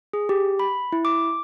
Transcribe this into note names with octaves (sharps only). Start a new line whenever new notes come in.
G#4
G4
B5
E4
D6